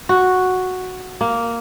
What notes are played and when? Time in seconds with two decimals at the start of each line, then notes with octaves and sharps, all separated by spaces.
0.09 F#4
1.21 A#3